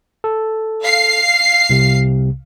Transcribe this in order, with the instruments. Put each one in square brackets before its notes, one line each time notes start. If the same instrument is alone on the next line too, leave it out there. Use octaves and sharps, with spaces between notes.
[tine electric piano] A4
[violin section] F5 C7
[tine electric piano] C2 C3